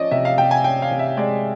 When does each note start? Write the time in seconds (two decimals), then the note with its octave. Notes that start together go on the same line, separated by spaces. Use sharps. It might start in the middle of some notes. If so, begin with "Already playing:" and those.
Already playing: F3 C#4 D5 D#5
0.11 C3 E5
0.25 F5
0.38 C3 G5
0.51 G#5
0.64 C#4 G5
0.82 F5
0.91 C3
0.99 E5
1.17 G#3 D5